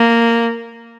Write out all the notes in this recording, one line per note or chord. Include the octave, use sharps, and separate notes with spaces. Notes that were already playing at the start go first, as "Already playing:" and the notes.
Already playing: A#3